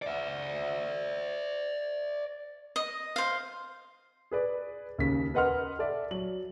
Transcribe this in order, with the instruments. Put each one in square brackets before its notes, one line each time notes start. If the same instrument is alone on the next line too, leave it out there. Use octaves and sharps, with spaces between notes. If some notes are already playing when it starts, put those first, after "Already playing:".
[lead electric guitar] D5 E5
[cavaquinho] D#5
C5 F5
[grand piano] G#4 B4 D5
D#2 C#3 B6
A#4 B4 D#5 F#5 C6 F6
A4 D5 E5
F#3 F#7